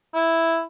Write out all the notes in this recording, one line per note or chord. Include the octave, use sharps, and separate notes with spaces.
E4